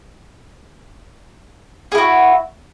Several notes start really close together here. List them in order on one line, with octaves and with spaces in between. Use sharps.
G#4 E4 F#4